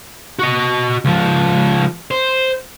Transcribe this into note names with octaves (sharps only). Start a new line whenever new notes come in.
F#4 D#5
C#2 F3
C5